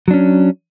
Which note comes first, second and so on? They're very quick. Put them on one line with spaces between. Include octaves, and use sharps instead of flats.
F#3 D4 C#4